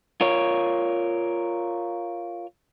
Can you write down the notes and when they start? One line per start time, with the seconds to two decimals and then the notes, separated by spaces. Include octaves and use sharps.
0.21 F4 A#4 C#5